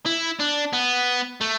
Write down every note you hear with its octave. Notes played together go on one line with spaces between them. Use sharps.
E4
D4
B3
A3